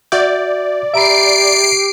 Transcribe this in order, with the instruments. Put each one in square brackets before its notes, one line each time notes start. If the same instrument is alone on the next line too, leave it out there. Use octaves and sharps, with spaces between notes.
[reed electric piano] F#4 E5 G6 [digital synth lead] D5
[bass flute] G4 [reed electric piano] E5 A#5 B5 [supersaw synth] C7 D7